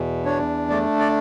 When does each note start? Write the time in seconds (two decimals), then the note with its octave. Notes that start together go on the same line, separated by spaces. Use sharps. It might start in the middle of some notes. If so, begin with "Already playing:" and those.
Already playing: E2 B2
0.25 D4 C#5
0.70 A3 D5
0.99 D5